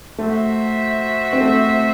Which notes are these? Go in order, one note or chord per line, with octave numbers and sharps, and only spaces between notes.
A3 F#4 C5 E5
C4
A3